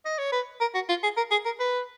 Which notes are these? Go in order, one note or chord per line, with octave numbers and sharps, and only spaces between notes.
D#5
C#5
B4
A#4
F#4
F4
G#4
A#4
G#4
A#4
B4